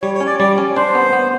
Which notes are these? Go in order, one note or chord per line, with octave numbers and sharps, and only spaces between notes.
G3 C#5
C#5
C#4
D5
G3 D5
C#4
D4 C5
B3
B3